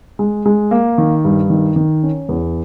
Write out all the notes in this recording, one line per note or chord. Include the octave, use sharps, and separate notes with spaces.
G#3
G#3
A#3
D#3
G2
D#3
D#3
C#4
E2